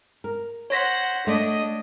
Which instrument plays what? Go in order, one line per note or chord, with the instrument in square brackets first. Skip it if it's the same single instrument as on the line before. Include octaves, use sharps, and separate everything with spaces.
[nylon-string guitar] A#4
[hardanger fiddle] C5 F#5 [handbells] C#5 A#6 B6
[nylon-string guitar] A3 [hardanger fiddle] D4 D#5